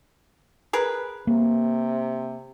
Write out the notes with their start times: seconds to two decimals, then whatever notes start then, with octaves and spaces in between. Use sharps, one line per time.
0.73 G#4 A#4 B4
1.27 C3 A#3